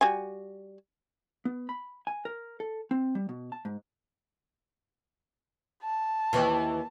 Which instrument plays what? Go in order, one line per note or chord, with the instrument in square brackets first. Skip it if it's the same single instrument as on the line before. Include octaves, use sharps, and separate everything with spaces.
[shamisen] G3 F#4 G#5
[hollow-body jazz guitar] B3
B5
G#5
A#4
A4
C4
G3
B2
A5
G#2
[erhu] A5
[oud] D#2 E3